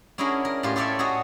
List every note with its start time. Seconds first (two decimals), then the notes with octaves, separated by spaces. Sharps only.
0.18 C#4 D4 E4 F#4 G#4 A#4
0.45 A#4
0.63 A2 G#3 F4 G4
0.76 F4 G4 A4 C#5 D5 E5
0.99 F#4 G#4 A4 C#5 D#5